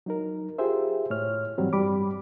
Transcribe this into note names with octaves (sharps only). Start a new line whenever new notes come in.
F#3 D#4 A#4
F4 G4 G#4 C5 E5
A2 C#5 F6
G#2 E3 F#3 G3 C4
G2 G3 B5 D6